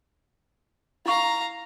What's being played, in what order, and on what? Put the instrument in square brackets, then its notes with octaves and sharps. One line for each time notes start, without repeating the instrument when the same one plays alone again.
[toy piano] E4 C#6 [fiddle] F5 A#5